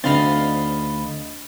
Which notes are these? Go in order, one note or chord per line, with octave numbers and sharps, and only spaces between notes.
D2 D3 C4 D#4 F5 B5 C6 A6